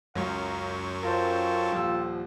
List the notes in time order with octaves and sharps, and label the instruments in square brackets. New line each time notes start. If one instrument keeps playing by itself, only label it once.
[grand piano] C#2 [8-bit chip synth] F#2 F#3 C#6 [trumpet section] F5 A#5
[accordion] F4 [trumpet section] A4 G5 A5 [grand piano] A#4 C5
[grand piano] D#1 F3 E6